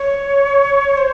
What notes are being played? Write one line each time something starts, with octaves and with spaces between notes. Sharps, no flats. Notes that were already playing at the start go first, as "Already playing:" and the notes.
Already playing: C#5
C5